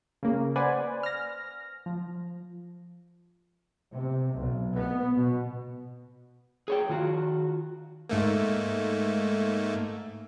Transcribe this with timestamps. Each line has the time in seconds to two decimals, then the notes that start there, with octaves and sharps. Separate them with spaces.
0.23 C#3 A#3
0.56 B4 C5 D5 F#5 G#5 B5
1.03 F6 A#6
1.86 F3
3.94 C3
4.32 B1
4.73 B3
5.15 B2
6.68 G#4 C#5 G5
6.89 D#3 F4 F#4
8.09 G#2 A3 A#3